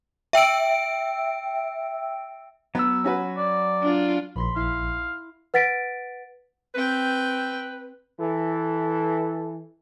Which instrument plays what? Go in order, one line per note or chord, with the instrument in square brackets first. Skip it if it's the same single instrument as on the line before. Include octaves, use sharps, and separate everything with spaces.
[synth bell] E5 G5 E6 D7
[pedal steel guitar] F#3 E6 [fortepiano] B3
[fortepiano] C#4 F#4 B4
[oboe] D5
[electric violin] D4 F4
[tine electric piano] A#1 [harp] B5 C6 B6
[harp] E4 [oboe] F5
[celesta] B4 F#5 A6 B6 D7
[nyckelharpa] C4 G5 [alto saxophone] B4
[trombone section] E3 A4